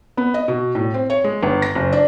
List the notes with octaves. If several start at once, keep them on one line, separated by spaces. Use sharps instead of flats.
B3
D#5
B2
A2
C4
C#5
G#3
G1
A#6
F#1
D4